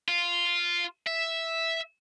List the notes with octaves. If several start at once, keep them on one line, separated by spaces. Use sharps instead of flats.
F4
E5